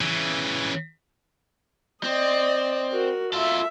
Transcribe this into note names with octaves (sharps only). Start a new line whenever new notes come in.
C#3 E3
C4 D5 D#5
F#4 A#4
F4 A4 E5